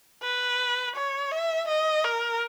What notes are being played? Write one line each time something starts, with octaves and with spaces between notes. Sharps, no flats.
B4
C#5
E5
D#5
A#4